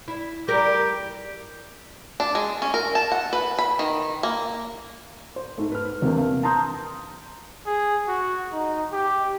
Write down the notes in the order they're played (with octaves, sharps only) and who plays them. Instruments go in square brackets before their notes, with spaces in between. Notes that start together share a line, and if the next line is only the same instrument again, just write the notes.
[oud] E4
[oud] G3 A#4 [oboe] G4
[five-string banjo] D4
G#3
C#4
A#4
A5
F#5
B4
B5
D#3
A#3
[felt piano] C5
G#2 A3
B4 F6
E2 C3 E3 A#3 C4 D4
F5
A5 A#5 C6 D#6 G6
[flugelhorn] G#4
F#4
D#4
G4